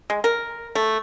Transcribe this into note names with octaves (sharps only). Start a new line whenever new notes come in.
G#3
A#4
A3